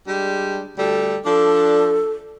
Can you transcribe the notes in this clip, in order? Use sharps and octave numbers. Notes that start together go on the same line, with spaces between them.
G3 G#3 D4
D2 G3 A4
F3 D4 A4